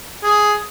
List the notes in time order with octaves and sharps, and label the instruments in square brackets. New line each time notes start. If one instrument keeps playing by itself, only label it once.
[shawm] G#4